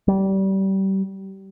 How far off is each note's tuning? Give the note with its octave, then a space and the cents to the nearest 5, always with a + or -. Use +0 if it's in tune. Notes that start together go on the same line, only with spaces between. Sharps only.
G3 -25